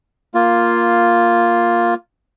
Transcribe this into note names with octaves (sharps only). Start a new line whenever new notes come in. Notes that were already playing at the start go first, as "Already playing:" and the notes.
A#3 F4